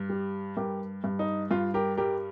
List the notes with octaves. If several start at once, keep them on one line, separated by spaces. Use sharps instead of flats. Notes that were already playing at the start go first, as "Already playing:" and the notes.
Already playing: G2
G3
G2 G4 A#4
G2
D#4
G2 F4
G4 A#4
G3 G4 A#4